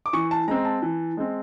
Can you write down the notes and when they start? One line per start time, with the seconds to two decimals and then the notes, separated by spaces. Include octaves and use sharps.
0.06 D6
0.13 E3 C#6
0.31 A5
0.48 G#3 C4 A#5
0.65 A5
0.82 E3
1.17 G#3 C4